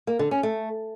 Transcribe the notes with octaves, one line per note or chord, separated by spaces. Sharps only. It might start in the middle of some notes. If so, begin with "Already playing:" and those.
A#3
D3
C#4
A3